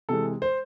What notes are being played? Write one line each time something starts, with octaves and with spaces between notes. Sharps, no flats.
C3 E3 G#3 A4
C5